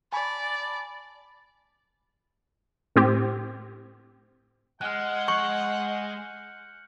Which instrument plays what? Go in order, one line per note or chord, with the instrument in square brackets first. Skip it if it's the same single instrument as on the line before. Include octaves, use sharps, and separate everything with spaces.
[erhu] D5 [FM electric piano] G#5 A5 B5
[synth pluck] A2 C4 G4
[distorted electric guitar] G#3 [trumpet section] F#5 [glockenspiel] F6 F#6
[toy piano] C#6 [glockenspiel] G6 C#7 F#7